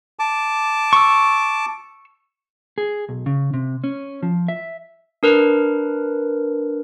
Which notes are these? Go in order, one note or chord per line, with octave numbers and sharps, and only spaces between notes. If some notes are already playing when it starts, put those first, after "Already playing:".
A5 D6
C#6 E6
G#4
B1
C#3
C3
C#4
F3
E5
D4 A#4 B4